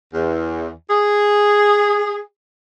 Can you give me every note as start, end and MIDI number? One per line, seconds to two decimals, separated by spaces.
0.14 0.70 40
0.90 2.20 68